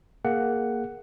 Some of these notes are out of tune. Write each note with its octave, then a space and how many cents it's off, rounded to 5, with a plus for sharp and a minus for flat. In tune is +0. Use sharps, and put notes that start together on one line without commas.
A#3 +0 G#4 +0 F#5 +10